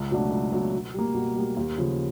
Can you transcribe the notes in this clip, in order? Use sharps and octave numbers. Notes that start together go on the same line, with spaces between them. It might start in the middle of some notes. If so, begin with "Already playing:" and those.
Already playing: C#2
B2 F#3 A3 D4
C#2
B2 F#3 A3 D4
B2
G3 A#3
B2
G3 A#3
D#2
C#3 F3